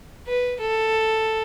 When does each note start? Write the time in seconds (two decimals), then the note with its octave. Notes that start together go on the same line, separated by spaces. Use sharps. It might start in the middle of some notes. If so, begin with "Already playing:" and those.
0.27 B4
0.60 A4